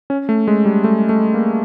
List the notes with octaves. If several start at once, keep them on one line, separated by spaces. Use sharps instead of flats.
C#4
A3
G#3
G3
A3
A3
A#3